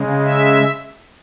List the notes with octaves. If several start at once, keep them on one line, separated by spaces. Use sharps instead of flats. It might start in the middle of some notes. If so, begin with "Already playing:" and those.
Already playing: C#3 G#3
E5